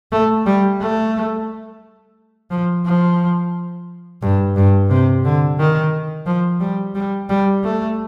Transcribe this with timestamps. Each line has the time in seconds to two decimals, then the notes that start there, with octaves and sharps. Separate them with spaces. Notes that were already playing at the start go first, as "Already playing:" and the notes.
0.12 A3
0.46 G3
0.80 A3
2.51 F3
2.86 F3
4.22 G2
4.56 G2
4.90 C3
5.25 D3
5.59 D#3
6.26 F3
6.60 G3
6.95 G3
7.29 G3
7.64 A3